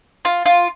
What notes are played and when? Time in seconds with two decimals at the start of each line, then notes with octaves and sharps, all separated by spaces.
0.25 F4
0.46 F4